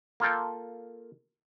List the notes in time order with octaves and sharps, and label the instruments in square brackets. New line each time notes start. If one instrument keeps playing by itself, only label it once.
[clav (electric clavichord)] A#3 F4 A4 G5